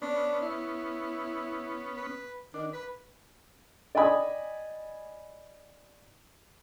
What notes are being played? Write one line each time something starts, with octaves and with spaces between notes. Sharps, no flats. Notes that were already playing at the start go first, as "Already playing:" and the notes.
B3 C#4 D4
E4
B4
D#3 D4
B4 B5
D5 D#5 G5 G#5 B5 D#6